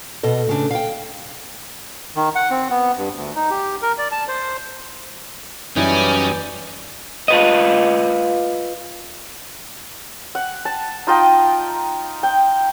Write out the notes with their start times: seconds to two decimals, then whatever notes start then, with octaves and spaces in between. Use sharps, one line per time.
0.23 B2 A4 D#5
0.47 A2 C#3 D4
0.71 F5 G5
2.16 D#3
2.35 F#5
2.51 C4
2.70 B3
2.98 G2
3.16 D2
3.36 D#4
3.50 G4
3.82 A#4
3.98 D5
4.11 A5
4.28 C5
5.76 F#2 E3 G3 C#4 D#4 D5 G#5
7.28 F4 B4 D#5
10.35 F#5
10.65 A5
11.07 D#4 F4 D#5 G5
12.23 G5